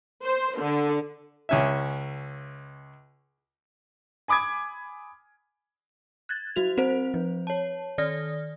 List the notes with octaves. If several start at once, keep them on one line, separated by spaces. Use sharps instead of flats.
C5
D3
C#2 C#4 E5
G#5 B5 D6 D#6 G#6
F#6 G#6 A6
F#3 F#4 F7
C4 C5
F3
C#5 A5
D#3 D5 D#6 F6 A#6